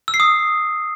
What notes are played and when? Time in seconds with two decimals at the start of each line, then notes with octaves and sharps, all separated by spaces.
0.08 E6
0.14 C7
0.20 D#6